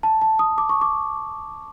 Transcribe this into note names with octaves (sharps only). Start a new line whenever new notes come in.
A5
A5
D#6
D6
C#6
D6